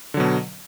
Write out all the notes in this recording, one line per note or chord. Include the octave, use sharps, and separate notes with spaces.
B2 D3 F#3